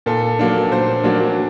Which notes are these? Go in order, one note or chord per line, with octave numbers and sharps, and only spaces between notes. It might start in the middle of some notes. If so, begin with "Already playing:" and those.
A#2 A4
F#3 A#3 D4
A#2 C5
F#3 A#3 D4